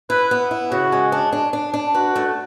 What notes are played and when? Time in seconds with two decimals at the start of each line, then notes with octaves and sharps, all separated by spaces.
0.10 E4 B4
0.31 B3
0.51 E4
0.72 C#3 F#4
0.92 G#3
1.12 D4
1.32 D4
1.53 D4
1.74 D4
1.94 F#4 B4
2.16 A3